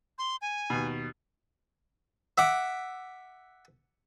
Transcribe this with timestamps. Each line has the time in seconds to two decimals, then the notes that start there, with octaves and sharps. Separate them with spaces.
0.18 C6
0.42 G#5
0.70 D#2 B2
2.38 E5 F#5 D6